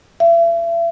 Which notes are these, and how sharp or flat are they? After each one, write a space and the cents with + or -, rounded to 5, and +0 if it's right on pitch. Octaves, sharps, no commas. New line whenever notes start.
E5 +40